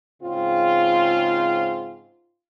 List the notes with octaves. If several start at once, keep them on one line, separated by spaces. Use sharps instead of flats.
G#2 C#3 C4 F4